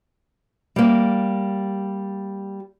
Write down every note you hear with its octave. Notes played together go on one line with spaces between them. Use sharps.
G3 A#3